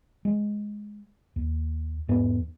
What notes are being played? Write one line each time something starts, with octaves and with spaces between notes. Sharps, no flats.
G#3
D#2
E2 G#2 B3